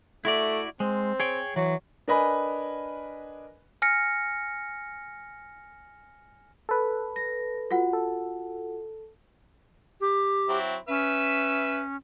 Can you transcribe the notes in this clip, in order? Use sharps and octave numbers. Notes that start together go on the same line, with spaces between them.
A3 E4 F#4 D5
G#3 C4
G#4 C#5 G5
E3 F#3
D4 A#4 B4 D#5 G#5 B5
G#5 F6 A#6 C#7
A4 B4
A#6
F4 F#4 F#5
A4
G4
F#3 C4 E4
C#4 B4 E5 E6